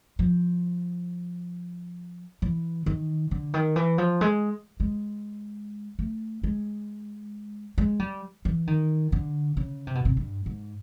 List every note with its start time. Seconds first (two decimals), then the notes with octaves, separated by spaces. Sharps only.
0.19 F3
2.42 E3
2.86 D#3
3.31 D3
3.54 D#3
3.76 E3
3.98 F3
4.21 G#3
4.80 G#3
5.99 A3
6.43 G#3
7.78 G#3
7.99 G3
8.45 E3
8.67 D#3
9.12 D3
9.57 C#3
9.87 C3
9.95 B2
10.05 C3
10.17 G2
10.46 G#2